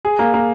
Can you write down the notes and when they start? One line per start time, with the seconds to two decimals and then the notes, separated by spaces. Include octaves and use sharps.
0.05 G#4
0.19 A#3
0.34 A#3